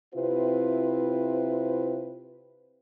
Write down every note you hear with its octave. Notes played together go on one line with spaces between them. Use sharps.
C3 C4 E4 F4 B4 C5